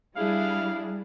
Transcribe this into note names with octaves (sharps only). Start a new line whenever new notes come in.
G3 D4 E4 G#4 F5